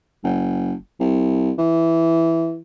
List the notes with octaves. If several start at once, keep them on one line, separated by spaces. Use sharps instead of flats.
F#1
C2
E3